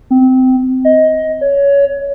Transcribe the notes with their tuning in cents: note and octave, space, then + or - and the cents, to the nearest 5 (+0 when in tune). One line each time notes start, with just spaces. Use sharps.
C4 -20
D#5 +15
C#5 +20